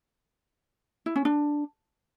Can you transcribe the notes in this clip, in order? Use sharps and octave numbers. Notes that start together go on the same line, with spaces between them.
E4
C#4
D4